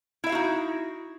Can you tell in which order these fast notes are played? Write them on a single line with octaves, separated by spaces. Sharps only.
E4 E5 F5 F#4 D#4